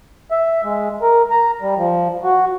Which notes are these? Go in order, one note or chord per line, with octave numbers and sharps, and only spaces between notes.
E5
G#3
A#4
A#5
G3
F3
F#4